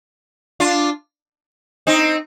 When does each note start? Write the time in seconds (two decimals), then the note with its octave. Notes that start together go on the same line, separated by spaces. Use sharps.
0.60 D4 F4
1.87 C4 D#4